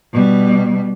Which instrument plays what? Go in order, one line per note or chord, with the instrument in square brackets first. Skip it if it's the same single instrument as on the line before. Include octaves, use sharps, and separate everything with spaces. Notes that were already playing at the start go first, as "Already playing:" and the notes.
[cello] B2 G3